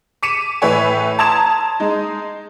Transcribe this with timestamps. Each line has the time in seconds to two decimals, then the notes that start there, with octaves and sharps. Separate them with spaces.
0.23 D6 B6 C#7 D#7 E7
0.62 A2 E3 B4 C#5 E5 G#5
1.19 A5 A#5 C6 D#6 G#6 E7
1.80 G#3 D#4